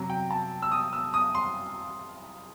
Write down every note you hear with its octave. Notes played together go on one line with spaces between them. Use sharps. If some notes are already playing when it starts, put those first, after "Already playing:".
Already playing: C3 F#3
G5
A5
E6
D#6
E6
D#6
C6